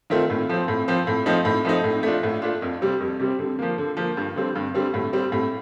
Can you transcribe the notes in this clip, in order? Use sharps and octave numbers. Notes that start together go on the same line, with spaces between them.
D#3 A3 C4 F4
A2
F3 C4
A2
F3 C4
A2
F3 A3 C4 D#4
A2
F3 A3 C4 D#4
A2
A3 D4 F4
A2
A3 D4 F4
F2
C3 G3 C4
F2
C3 G3 C4
D3
F3 A#3
D3
F3 A#3
G2
D3 G3 C4
G2
D3 G3 C4
A2
G3 C4
A2